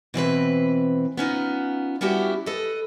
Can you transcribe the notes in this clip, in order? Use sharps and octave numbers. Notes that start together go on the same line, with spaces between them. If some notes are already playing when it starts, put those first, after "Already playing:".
B2 E3 C4 B4
B3 C#4 D#4 F4
G3 B3 C#4 E4 F#4 G4
A4 B4 D#5